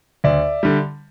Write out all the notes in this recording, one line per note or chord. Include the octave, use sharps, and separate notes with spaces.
D2 D5 E5
D3 G3